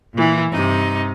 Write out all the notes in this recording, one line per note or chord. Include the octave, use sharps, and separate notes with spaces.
A#2 E3
G2 C3 D#4